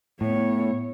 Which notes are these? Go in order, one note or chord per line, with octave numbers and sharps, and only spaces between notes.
A2 B3 C#5